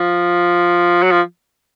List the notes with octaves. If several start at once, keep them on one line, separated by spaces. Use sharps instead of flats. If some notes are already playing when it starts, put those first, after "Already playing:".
Already playing: F3
F#3
F3